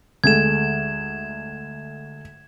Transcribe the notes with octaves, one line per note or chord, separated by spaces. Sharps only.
D2 G#3 A4 G#6 E7